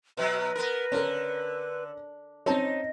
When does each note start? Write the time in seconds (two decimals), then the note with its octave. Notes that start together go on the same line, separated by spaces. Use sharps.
0.17 B2 F#3 B4
0.55 B3 A#4
0.92 D3 C#4 A#4
2.46 C4 C#4 D#4 A5